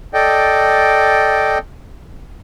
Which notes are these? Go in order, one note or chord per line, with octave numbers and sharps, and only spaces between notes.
A4 D5 D#5 G5